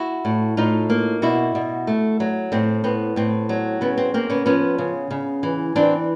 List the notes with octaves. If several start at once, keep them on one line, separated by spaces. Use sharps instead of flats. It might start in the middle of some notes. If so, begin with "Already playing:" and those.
Already playing: E4 F#4
A2
A2 D#4 F4
A#3
B2 E4 F#4
B2
A3
F#3
A2 C4
B3 C4
A2 C4
F#3
C#3 B3
C4
A#3 C4
B3 C#4
F3 B3 C#4
C#3
C#3
E3
E3 C4 D4